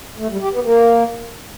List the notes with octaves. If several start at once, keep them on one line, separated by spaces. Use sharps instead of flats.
A3
G3
G4
B3
A#3